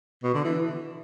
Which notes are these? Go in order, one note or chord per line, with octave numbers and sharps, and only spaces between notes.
B2
D3
E3